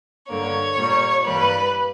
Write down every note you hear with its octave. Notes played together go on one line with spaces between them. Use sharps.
G2 D3 A#3 C#5
A#2 G3 A#3
G2 E3 G3 A#3 B4